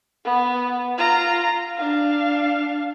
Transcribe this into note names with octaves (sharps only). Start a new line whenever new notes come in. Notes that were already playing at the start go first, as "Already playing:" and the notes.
B3
F4 A#5
D4 F5